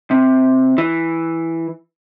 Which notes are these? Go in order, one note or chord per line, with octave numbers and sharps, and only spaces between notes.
C3
E3